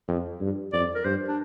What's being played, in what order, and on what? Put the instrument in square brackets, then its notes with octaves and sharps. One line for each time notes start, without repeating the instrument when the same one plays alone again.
[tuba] F2
G2
[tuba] F2 [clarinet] D5
[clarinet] A#4
[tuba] G2 [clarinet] C5
[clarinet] D4